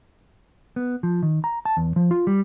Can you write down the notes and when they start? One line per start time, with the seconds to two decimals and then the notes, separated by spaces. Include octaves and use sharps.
0.76 B3
1.03 F3
1.23 D#3
1.44 A#5
1.65 A5
1.77 E2
1.96 F3
2.11 F4
2.27 G3